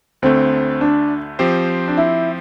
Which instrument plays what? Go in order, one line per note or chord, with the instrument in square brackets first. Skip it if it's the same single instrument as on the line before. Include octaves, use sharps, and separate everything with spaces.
[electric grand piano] D2 D3 A3 [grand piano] C4
[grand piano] D4
[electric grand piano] F3 C4 G4 C5
[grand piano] D4
E4